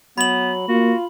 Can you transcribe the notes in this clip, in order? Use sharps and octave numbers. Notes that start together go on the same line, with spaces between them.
F#3 B3 B5 F#7
A#3 F4 F#4